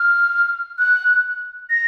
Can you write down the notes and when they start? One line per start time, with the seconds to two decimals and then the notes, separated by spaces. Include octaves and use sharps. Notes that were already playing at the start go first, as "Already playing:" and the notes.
Already playing: F6
0.78 F#6
1.70 A#6